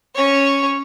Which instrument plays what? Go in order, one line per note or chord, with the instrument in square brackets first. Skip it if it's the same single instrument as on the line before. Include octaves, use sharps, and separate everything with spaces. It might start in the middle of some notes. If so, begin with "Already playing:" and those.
[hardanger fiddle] C#4 C#5